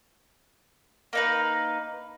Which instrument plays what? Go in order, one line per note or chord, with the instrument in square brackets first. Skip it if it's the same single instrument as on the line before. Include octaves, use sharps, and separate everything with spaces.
[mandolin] A#3 D#4 B4